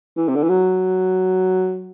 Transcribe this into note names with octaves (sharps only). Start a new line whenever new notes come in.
E3
C3
D3
E3
F#3